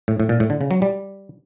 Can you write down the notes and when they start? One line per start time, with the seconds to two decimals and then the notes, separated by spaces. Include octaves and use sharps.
0.08 A2
0.20 A2
0.29 A#2
0.40 A2
0.50 D3
0.61 C#3
0.71 F#3
0.82 G3